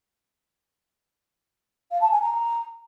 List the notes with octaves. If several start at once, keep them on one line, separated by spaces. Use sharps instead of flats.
F5
A5
G#5
A#5